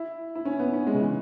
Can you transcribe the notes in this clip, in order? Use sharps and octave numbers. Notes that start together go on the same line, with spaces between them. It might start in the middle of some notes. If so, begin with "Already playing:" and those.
Already playing: E4
E4
C#4
B3
C#4
G#3
C#3
E3